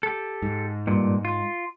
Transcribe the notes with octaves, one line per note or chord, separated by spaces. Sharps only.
G4 A4
G#2
G2 A#2
F4